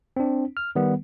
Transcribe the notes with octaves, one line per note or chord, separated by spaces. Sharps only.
C4 D4
F6
D#3 G3 B3